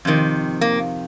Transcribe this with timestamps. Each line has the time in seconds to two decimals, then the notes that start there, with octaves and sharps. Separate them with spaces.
0.05 F2 C3 D#3
0.61 A#3